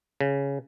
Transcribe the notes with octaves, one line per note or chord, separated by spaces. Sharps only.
C#3